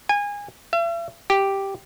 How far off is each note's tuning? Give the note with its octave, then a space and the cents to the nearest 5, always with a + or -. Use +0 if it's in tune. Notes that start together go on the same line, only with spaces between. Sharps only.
G#5 -25
E5 +45
G4 +0